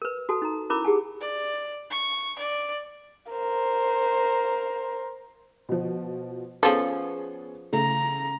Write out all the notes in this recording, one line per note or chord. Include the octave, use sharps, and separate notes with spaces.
A#4 B4
F#4 A4 A5
D#4 A#5
C#4 E4 A#4 B5 D6
G4 G#4 F#5 A5
D5
C#6
D5
A#4 C5
B2 F3
F3 B3 C#4 G#4 A4
C#3 A3 A#5